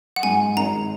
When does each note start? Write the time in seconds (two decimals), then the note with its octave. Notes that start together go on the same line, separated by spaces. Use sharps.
0.16 F#5
0.23 G#2 G#5
0.57 G#1 A#5